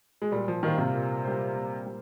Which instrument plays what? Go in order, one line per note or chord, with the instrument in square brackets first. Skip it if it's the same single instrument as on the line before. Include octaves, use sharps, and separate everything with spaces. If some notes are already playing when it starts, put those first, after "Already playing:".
[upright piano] G#3
[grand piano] A#2 [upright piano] G3
[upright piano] F3
[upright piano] D#3 [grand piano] G3 A#3 F4 C5
[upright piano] C3
[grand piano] A#2
G3 A#3 F4 C5
A#2
G3